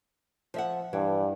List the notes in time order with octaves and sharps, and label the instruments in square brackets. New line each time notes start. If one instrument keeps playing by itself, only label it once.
[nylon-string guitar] F3 E5 F#5
[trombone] G2 [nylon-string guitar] E3